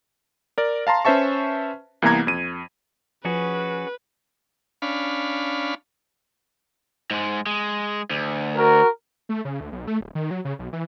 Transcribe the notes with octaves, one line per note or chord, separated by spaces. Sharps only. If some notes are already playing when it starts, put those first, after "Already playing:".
A#4 D5
F5 A5 A#5 C6
C#4 B4 C5 E5 A5 C#6
C2 E3 A#3 B3 A#5 G#6
F2 D#7
F3 C#4 F#4 G#4 B4
C#4 D4 F5 B5
G#2 G#3
G#3
D2
F#4 A#4
A3
C#3
D2
B1
A3
D1
D#3
F#3
C#3
B1
E3